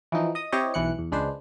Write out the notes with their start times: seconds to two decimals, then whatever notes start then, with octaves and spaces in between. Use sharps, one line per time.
0.12 E3 F3 D#4
0.35 D#5 D#6
0.52 C4 E4 G4 C5 C#5 D#5
0.74 B1 E3 F#6 C#7
0.98 E2
1.12 C#2 G#3 D4 B4 C5